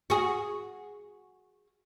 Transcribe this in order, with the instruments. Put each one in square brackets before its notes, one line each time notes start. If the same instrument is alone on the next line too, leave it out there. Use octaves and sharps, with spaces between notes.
[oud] F#4 G#4